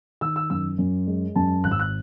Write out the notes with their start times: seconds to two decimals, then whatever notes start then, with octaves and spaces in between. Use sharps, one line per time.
0.21 D#3 E6
0.36 E6
0.50 F#2 E6
0.78 F#2
1.07 G#3
1.36 F#2 A5
1.64 G#1 F#6
1.71 E6
1.80 F#6